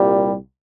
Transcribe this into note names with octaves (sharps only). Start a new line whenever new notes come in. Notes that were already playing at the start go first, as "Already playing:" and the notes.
Already playing: C2 A#2 G3